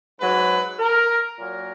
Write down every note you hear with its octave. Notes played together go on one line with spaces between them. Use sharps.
G#2 F#3 B4
A#4
A#2 F#3 A#4